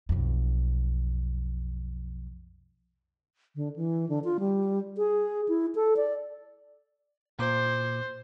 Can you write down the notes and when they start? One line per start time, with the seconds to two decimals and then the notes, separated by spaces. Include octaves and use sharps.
0.09 B1 F2
3.55 D3
3.76 E3
4.09 D3
4.24 F4
4.40 G3
4.97 G#4
5.48 E4
5.75 A4
5.97 D5
7.39 A#2 A#3 C5 D6